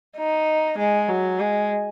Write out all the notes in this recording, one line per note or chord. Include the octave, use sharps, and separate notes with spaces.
D#4
G#3
F#3
G#3